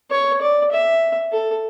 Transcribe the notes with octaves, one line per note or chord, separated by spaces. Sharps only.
C#5
D5
E5
A4